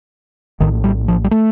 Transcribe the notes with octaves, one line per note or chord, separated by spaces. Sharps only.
A#1 A2 D#3
G3
F3
G3
A3